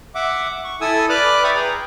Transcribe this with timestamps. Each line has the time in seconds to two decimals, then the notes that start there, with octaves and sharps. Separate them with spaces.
0.15 E5 F#5 D6
0.64 C#6
0.81 E4 A4 G#5 D#6 E6
1.09 B4 D5 D6 F6 F#6
1.43 D5 E5 G5 B5 C#6 D#6
1.55 G#4 G5 A#5